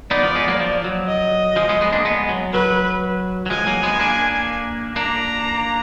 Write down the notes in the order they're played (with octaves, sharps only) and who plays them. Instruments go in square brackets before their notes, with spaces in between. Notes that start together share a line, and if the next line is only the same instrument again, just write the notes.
[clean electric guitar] B3 D#4 [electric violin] D5
[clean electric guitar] F3
G#3 B3
F#3 A#3
F3
F#3
[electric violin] D#5
[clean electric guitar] F3 G#3
G#3 B3
G#3 B3
A#3 D4
G#3 B3
F#3
[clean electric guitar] F#3 [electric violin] B4
[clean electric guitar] F#3
[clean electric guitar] F3 G#3 [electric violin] G#5
[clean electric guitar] F#3 A#3
G#3 B3
A#3 D4
[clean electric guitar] A#3 D4 [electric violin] A#5